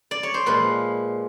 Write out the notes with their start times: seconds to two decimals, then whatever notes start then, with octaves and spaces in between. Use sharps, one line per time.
0.11 D5
0.23 C#5
0.34 C5
0.46 A#2 F3 G#3 B4